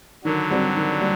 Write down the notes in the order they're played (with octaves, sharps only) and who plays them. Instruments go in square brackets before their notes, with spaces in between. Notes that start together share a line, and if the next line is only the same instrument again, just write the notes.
[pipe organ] D3 F#3 [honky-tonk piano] D#3
[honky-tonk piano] G3 C4 F#4
D#3
G3